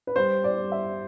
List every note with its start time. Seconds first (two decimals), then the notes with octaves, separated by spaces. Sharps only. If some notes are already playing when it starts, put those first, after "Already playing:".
0.07 B4
0.16 G3 C5
0.44 D5
0.57 G3
0.72 E5